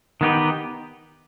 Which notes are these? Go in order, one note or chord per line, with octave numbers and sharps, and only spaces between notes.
D#3 B3 D#4 G4 B4